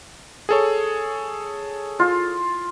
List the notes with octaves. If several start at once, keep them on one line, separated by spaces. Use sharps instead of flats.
G#4 A4 C#5
F4